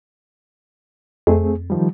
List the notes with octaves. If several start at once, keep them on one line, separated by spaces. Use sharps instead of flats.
F2 A3 C4 G#4
D#3 F3 G3